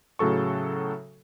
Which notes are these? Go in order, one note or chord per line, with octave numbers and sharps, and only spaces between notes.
A2 C#3 F#3 A4 C#6